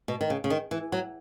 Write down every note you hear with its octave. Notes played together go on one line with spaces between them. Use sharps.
B2
D#3
C#3
C#3
D#3
E3
F#3